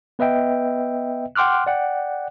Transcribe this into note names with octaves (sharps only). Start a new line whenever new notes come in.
B3 B4 D#5 E5 G5
F#5 G5 C6 D6 F6 F#6
D5 F#5 G5